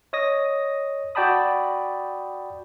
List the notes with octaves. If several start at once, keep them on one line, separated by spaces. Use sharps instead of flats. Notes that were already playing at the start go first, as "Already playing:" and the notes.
C#5 D#5 D#6 A#6
F#4 D5 G5 A5 B5 D#6